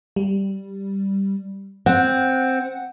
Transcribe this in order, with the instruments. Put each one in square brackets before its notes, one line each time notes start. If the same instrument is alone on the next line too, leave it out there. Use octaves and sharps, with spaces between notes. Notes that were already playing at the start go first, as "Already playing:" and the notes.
[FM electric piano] G3
[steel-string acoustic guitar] C4 [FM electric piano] F#5